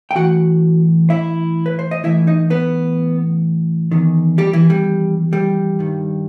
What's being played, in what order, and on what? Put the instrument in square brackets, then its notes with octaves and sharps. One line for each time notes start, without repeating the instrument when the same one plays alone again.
[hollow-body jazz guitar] G5
A2 E3 F#4 F#5
E4 E5
B4
C5
D#5
A2 E3 E4 E5
D#4 D#5
B3 B4
E2 D#3
G3 G4
E3 E4
G3
G3
G2 D#3